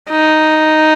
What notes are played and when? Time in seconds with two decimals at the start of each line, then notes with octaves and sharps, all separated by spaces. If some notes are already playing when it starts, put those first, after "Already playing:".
0.10 D#4